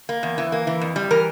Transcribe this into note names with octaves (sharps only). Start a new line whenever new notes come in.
A#3
E2
E3
A#3
E3
F2
G3
E3 A#4